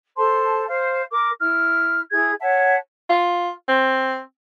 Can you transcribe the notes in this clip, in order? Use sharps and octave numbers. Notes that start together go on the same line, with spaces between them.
A4 C5 A5 C6
C5 F5
A#4 D6
E4 F6
E4 G#4 G#6
C#5 E5 F#5 A5
F4
C4